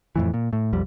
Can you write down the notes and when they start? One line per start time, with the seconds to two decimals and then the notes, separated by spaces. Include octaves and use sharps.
0.16 F2 A2 E3
0.34 A#2
0.53 A2
0.73 B1 F2 G3